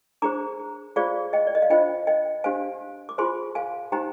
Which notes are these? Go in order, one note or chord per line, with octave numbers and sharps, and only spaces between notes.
D4 G#4 C5 A#5 D6
F4 G#4 C5 D5 F5
D#5 G5
D5
D#5
F5
D4 F4 C5 D#5 G5
D#5 G5
D4 G4 C5 F5 G#5
D6
F4 G#4 C5 G#5 C6
F5 G#5
D#4 G4 C5 G5 A#5